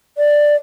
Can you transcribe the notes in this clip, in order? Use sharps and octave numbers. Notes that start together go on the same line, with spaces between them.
D5